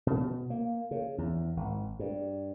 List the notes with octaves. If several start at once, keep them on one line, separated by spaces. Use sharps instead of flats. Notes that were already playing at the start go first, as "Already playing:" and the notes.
B2
A#3
C#3
E2
G#1
G2